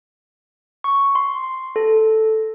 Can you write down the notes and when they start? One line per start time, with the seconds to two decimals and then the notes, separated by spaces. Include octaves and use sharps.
0.84 C#6
1.15 C6
1.76 A4